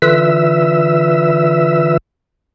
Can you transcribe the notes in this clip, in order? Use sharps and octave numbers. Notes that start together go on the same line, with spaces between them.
D3 E3 F4 B4 E5 E6